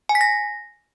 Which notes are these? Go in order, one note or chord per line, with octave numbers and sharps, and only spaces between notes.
G#5
B6
A#6